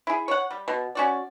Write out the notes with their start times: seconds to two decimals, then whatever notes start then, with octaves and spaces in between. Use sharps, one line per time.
0.07 E4 G#4
0.28 C#5 F#5
0.51 G3
0.68 B2
0.95 C#4 F#4 D5